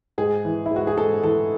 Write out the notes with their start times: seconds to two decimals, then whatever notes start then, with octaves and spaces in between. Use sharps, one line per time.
0.18 G#2 G#4
0.45 E3
0.66 G#2 E4
0.76 F#4
0.87 G#4
0.97 G#2 A4
1.23 E3 A4